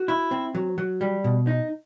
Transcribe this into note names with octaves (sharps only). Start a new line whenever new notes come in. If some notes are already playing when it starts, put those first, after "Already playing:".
Already playing: F#4
E4
C4
F#3
F#3
G3
B2
D#4